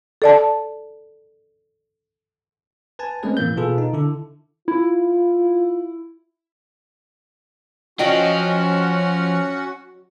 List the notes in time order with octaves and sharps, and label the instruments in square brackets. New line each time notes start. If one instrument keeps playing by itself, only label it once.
[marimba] A4 D5 A5
[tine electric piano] B4 G#5 A5
G#3 A3 C4 C#4 G#4 B4
A2 E3 A#3 G6
B2 B3 F4 G#4 A4 B4
D#4
D3 E4 A4
[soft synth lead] E4 [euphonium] F4
[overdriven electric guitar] F3 F4 [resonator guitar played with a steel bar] F#3 D#5 G5 [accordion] C#4 F#4 F#5